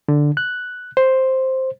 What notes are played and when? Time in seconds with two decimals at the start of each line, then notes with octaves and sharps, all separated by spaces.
0.08 D3
0.37 F#6
0.97 C5